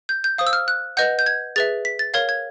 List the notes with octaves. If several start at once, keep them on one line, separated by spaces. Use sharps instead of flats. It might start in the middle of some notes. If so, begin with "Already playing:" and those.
G6
G6
C5 F5 D#6
E6
F6
F#6
B4 D#5 F#5 G6
G6
G#6
G#4 B4 E5 A6
B6
A6
A#4 C#5 F5 G#6
G#6